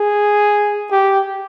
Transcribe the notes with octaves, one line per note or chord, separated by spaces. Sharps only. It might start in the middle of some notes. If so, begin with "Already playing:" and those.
Already playing: G#4
G4